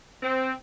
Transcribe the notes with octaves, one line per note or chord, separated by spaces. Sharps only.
C4